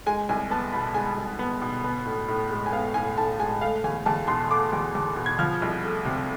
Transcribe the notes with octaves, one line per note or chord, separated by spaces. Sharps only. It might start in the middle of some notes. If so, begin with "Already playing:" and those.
G#3 G#5
C2 G#5
B3 A5
B2 B5
G#3 G#5
C2
B3
B2
B3
A2
A2
G#3
G#5
B3 F5
A2 G#5
A2 A5
G#3 G#5
A3 F5
E2 G#5
E2 A5
B2 C6
A3 D6
E2
E2
B2
G#6
F3 F6
C2
A3
C3